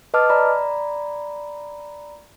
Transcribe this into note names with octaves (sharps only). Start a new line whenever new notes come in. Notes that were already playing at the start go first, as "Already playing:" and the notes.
B4 D#5 A5 D6 F6
D5 A#5 B5